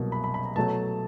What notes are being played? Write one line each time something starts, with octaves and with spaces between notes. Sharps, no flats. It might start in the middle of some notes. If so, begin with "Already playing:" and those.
Already playing: C2 B2 F#3 A#3
B5
B5
B5
A#5
B2 F#3 A3 A5